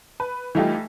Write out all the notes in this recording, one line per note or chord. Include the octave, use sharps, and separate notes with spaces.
B4
E3 G3 A3 D#4 F4 G4